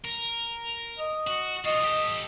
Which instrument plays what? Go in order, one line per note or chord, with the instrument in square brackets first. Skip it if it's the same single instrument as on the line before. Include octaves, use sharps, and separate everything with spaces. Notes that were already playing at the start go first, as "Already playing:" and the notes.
[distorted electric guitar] A#4
[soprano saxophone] D#5
[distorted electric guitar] F#4
[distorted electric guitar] F4 F#4 [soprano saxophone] D#5
[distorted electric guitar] G4 A4